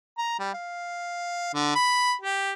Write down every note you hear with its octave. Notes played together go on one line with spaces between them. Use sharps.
A#5
G3
F5
D3
B5
G4